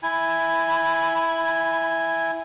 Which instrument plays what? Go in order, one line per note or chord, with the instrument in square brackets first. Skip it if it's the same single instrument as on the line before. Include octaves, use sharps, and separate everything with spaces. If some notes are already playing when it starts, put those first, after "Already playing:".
[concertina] E4 G#5 [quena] B5